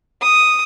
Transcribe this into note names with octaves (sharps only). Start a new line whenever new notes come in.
D#6